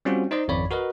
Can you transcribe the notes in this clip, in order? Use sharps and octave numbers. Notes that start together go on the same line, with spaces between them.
G3 C4 C#4 F4 F#4
D#4 C5 D5 D#5 C6
G#1 F2 C#5 D5 B5
F#4 A#4 B4 D#5